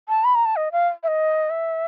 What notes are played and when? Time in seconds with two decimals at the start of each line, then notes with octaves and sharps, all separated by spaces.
0.09 A5
0.24 B5
0.35 A#5
0.45 A5
0.56 D#5
0.72 F5
1.03 E5
1.08 D#5
1.50 E5